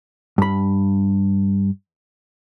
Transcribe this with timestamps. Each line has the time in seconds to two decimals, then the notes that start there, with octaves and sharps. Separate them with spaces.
0.38 G2 B5